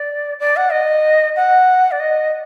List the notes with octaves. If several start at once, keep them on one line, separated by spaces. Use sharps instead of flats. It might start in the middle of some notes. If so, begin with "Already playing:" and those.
Already playing: D5
D5
F#5
D#5
F#5
D5
D#5